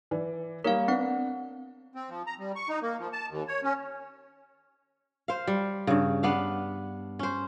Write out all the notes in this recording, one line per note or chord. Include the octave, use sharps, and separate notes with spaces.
E3 D5
G3 A#3 A#4 C#5 F5
B3 C4 D4 F#5
C4
F3
A#5
G3
C#6
D#4
A#3
F3
A5
D#2
C#5
C#4
C5 F5
G3
G2 C#3
B3 D4 F5
C#4 C5